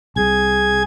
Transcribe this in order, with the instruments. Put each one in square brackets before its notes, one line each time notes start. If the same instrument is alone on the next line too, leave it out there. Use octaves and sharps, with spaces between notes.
[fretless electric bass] C2 [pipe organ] G#4 G#6